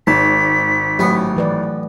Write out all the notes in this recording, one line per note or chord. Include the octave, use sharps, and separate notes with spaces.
G#1 A5 B6
A1 F#3 B3 C#5 C#6
E3 B4 D5